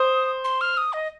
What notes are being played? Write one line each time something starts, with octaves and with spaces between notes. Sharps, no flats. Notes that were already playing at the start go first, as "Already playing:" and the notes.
Already playing: C5 D#6
C6
F6
D#6
D#5